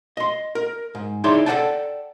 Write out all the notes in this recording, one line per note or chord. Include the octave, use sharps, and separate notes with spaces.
D#5 C6
A#4
G#2
D#4 E4 G#4 C#5 D5 C6
A4 C5 D5 F#5 G5 A5